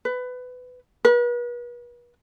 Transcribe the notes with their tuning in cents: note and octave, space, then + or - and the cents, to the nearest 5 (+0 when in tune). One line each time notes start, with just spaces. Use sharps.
B4 +20
B4 -40